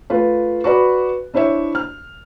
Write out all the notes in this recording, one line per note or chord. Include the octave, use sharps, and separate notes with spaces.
A3 F4 B4
F#4 B4 D5 B5
D4 E4 C5 C#5 E5
F6